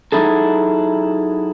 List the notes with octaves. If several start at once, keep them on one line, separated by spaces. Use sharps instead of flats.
F#3 D#4 E4 G#4 A4